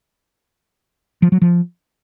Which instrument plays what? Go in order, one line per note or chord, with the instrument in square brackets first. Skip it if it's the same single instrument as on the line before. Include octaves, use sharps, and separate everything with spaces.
[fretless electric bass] F3
F#3
F3